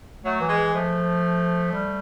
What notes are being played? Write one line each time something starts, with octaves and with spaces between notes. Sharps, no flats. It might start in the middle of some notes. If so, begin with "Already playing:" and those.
F#3 A3
E3
G#3
E3
F3 A3
G3